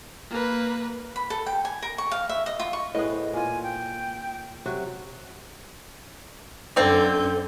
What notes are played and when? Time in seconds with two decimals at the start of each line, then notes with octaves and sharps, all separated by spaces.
0.31 A#3 B4
1.16 B5
1.30 A4
1.46 G5
1.65 G#5
1.82 A#4
1.98 C#6
2.11 F5
2.29 E5
2.46 D#5
2.60 F4
2.73 C#6
2.95 A2 B3 G#4 B4 C#5 D#5
3.09 C5
3.34 A#2 F4 G#5
3.63 G5
4.66 C3 F#3 F#4
6.76 F#2 D3 A#3 C4 D5 G6